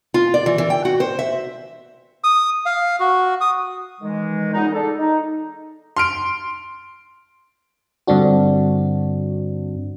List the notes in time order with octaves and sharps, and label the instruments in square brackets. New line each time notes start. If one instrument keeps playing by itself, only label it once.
[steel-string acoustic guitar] F4
D5
E3
E3
G5
F#4
C5
E5
[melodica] D#6
F5
F#4
D#6
[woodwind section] D#3 E3 G#3
A#2 C#3 B3 D#4
D4 G#4 A4
D#4
[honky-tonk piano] C6 F6 D7
[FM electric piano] G2 D3 C4 D4 F#4